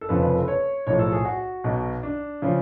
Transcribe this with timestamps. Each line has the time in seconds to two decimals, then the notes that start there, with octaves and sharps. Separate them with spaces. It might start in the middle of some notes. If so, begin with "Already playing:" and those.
0.01 A4
0.09 F1 F2 C#3 F3 B4
0.23 B4
0.36 A4
0.42 B4
0.48 C#5
0.87 B1 A2 F3 C#5
0.99 A4
1.12 G#4
1.25 F#4
1.64 B1 B2
2.03 D4
2.42 C#3 F3